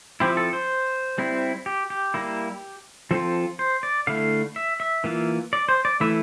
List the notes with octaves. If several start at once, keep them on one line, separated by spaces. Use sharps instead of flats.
F3 C4 E4 G4
A4
C5
G3 C4 E4
G4
G4
G3 A#3 E4
F3 C4 F4 A4
C5
D5
D3 A3 E4 F5
E5
E5
E3 A#3 F4
D5
C5
D5
E3 A3 E4 E5